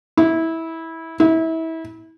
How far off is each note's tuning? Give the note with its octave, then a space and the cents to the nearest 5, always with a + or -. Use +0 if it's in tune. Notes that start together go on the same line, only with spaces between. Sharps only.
E4 -20
E4 -30